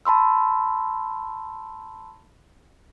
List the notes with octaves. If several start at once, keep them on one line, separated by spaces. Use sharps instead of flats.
A5 B5 C6 E6